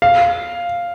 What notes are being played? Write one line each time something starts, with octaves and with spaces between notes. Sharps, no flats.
F5